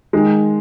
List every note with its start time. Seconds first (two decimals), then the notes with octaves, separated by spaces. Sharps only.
0.13 D#3 G#3